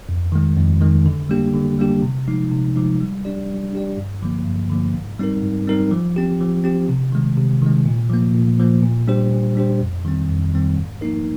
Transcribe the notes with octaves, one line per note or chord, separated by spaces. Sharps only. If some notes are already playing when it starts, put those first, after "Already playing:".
F2
D#3 G#3
F2
D#3 G#3
D3
G3 A#3 D4 G4
D3
G3 A#3 D4 G4
C3
F3 G#3 D#4
C3
F3 G#3 D#4
G3
D4 G4 D5
G3
D4 G4 D5
G2
D3 F3 A#3
G2
D3 F3 A#3
G#2
G3 C4 D#4 A#4
G#2
G3 C4 D#4 A#4
F3
C4 G4
F3
C4 G4
C3
D#3 G#3
C3
D#3 G#3
A#2
F3 A#3
A#2
F3 A#3
A#2
G3 D4 G4 C5
A#2
G3 D4 G4 C5
F2
D#3 G3 C4
F2
D#3 G3 C4
G#2
F3 A#3 D#4 A#4